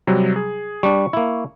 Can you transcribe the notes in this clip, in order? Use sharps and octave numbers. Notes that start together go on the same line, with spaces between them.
C3 F#3 G3
G#4
G3 D4 C#6
A#3 E4